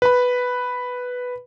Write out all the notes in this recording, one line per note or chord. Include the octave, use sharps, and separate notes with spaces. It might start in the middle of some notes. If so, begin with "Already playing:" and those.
B4 B5